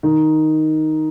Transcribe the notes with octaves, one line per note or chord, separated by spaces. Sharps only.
D#3